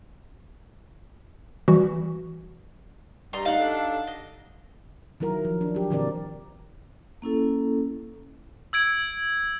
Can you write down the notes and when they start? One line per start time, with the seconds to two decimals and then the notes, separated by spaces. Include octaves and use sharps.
1.68 E3 G3 F#4
3.33 G2 G3 D#5 A#5 C6
3.45 D#4 F5 F#5
3.59 D4 G4 A4
4.07 D#5
5.20 D#3 F#3 E4 A#4
5.45 F3
5.61 D4
5.75 F#3 G4
5.90 A#2 D3 E3 C4 A#4 D5
7.22 A#3 C#4 E4 A4
8.73 E6 G#6 D7